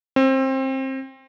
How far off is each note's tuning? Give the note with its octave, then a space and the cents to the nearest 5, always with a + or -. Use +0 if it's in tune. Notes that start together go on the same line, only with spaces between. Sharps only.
C4 +25